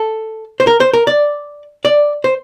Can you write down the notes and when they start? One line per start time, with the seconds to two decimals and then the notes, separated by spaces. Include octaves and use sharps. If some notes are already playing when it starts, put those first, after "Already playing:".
Already playing: A4
0.60 C5
0.67 A#4
0.80 C5
0.94 A#4
1.07 D5
1.85 D5
2.24 C5